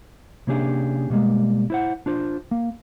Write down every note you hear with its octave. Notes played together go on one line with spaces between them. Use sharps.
C3 A#3 C#4 D4 G4 G#4
B2 G3 G#3 A#3
E4 C5 F#5
D4 F4 C5
A#3